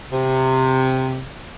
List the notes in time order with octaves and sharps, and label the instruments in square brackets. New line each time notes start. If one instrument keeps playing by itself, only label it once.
[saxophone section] C3